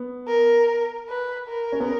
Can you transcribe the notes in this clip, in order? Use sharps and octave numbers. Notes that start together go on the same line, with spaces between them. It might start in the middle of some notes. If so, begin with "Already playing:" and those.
Already playing: B3
A#4
B4
A#4
C#4
B3